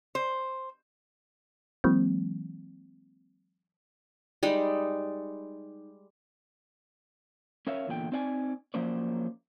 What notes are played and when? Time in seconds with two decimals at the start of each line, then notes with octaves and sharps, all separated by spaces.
0.15 C5
1.84 E3 F#3 G#3 A#3 C4
4.43 G3 G#3 D#4 B5
7.67 C#4 A#4 C#5 E5 F5
7.87 E2 A#2 D3 E4 G5
8.12 C4 D#4 D5 F#5 G#5
8.74 F3 F#3 A#3 C#4 C5 D5